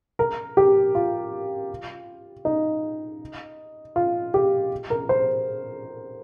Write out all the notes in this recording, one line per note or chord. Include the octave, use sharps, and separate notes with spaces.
A#4
G4
F4
D#4
F4
G4
A#4
C5